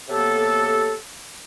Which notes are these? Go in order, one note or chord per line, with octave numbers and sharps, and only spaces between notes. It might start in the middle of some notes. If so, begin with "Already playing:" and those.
C3 F#3 A#3 B3 G4 A4